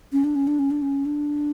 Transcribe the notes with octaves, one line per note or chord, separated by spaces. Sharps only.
C#4
D4
C#4
D4
C#4
D4
C#4
D4